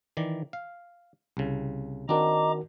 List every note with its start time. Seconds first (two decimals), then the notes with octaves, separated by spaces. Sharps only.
0.17 D#3 E3 D5
0.53 F5
1.37 C2 C#3
2.09 D#3 C4 D4 F#4 A#4 D#5 A#5 D6